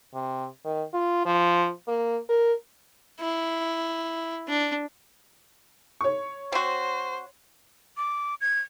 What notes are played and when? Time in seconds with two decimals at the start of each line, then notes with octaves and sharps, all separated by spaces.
0.14 C3
0.65 D#3
0.93 F4
1.25 F3
1.88 A#3
2.29 A#4
3.20 E4
4.48 D4
6.01 C#5 C#6
6.52 C4 F#4 C5
7.97 D6
8.41 G#6